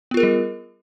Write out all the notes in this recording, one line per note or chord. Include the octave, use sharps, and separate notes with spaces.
G3 B3 F4 G#4 A#4